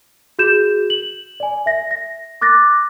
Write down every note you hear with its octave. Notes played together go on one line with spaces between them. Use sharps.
F#4 G#4 G6 E7
F#7
D5 G#5
E5 A#6
A#6
D6 F#6 A6 A#6